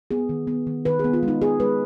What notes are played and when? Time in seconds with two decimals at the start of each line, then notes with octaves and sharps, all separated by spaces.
0.11 B3 G#4
0.29 D#3
0.47 B3
0.67 D#3
0.85 D#3 B4
0.99 G#4
1.04 B3
1.13 F4
1.23 G#3
1.28 D#4
1.42 B3 G#4
1.60 G#3 B4